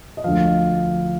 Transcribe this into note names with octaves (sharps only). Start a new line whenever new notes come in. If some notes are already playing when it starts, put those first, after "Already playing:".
D#5
D2 D3 F3 F5